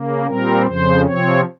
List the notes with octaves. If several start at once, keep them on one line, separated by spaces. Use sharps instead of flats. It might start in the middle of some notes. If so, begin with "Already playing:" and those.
Already playing: C#3 A#3
A#2 G3 C4 A#4
F2 C#3 F3 C5
C3 F3 C4 C#5